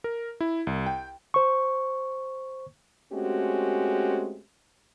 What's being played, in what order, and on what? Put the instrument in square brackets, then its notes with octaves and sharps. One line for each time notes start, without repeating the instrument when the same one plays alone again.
[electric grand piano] A#4
E4
C2
G5
[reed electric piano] C5 C#6
[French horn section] G#3 A3 C4 C#4 F#4 G4